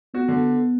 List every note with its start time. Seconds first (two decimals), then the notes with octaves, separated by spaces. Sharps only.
0.14 B3 F#4
0.28 D3